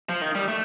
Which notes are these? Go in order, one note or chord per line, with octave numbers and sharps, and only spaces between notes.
F3
D#3
G3
A3